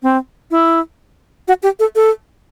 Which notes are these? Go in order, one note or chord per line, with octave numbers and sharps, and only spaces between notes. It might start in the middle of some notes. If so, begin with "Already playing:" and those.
C4
E4
F#4
G4
A4
A4